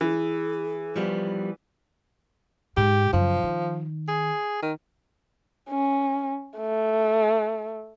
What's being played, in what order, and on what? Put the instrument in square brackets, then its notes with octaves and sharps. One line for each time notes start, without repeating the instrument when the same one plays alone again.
[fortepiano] E3 [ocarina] G#4
[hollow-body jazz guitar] F3 G3 B3
[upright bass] G#2 [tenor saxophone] G4
[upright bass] F#2 C#3 [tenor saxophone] F3
[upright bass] D#3
[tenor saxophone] G#4
D#3
[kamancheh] C#4
A3